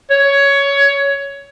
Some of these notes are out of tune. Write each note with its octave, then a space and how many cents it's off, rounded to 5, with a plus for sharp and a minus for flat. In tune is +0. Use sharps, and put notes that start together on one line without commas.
C#5 +15